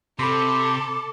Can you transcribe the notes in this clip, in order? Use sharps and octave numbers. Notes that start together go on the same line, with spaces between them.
C3 A4 B5 C6 D6